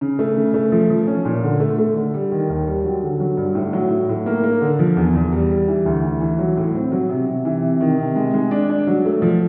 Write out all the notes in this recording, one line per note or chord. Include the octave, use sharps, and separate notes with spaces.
C#3
A3
C#3
A3
F3
F3
C#4
A#2
D3
A3
A3
D3
G3
D#3
D#2
G3
F#3
D3
F#3
G2
A2
F#3
A2
A2
A#3
A#3
D3
F3
E2
E2
G3
G3
E3
D2
E3
E3
F#3
A2
C4
F#3
C3
C3
E3
C3
D#3
C3
G#3
G#3
D4
D4
F#3
A3
F3